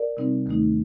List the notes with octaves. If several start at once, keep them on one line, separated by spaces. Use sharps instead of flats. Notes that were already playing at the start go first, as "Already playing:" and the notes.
Already playing: A#4 D5
C3 G3 C4 D#4
D#2 D#3 A3 D#4